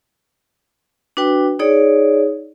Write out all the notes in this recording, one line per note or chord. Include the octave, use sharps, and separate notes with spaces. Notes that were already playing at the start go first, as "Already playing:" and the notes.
D4 F#4 B4 G5
D#4 G#4 C#5 D5